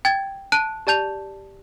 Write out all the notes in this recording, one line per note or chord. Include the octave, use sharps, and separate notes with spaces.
G5 G#6 A6
A5 F#6 D7 D#7
G4 D5 A5 G6 F7